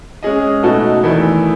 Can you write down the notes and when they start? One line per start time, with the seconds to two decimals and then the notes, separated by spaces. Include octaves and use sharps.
0.23 G#3 C#4 G#4 D#5
0.63 B2 A3 D#4 F#4 A4
1.03 E2 D#3 A3 E4